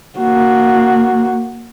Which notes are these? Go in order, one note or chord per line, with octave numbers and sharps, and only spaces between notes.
A#3 F#4